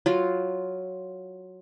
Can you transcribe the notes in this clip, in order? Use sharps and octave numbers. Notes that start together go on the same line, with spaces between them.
F#3 F4